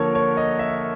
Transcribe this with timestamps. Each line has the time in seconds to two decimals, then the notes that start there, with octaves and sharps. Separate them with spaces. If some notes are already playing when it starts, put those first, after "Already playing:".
Already playing: D3 F3 A#3 A4 A#4 C#5
0.15 C#5
0.37 D#5
0.59 E5